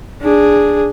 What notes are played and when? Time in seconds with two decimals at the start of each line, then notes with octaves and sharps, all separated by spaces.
0.22 D4 G#4